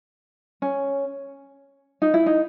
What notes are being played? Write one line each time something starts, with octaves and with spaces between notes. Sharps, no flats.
C#4
D#4
E4
D#4